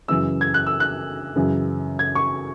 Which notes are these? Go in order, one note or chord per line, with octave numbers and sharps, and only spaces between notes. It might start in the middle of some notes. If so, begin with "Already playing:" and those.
F#2 C#3 E3 E6
G#6
F#6
E6
F#6
F#2 C#3 E3
G#6
C#6